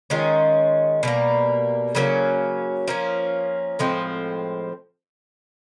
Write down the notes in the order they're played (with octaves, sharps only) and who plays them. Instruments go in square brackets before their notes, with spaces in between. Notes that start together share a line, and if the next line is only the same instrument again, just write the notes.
[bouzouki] D#3 G#3 C#4 F4
B2 G3 A#3
C#3 F#3 A#3 C#4
F3 A#3 C#4
A2 F3 G#3 C4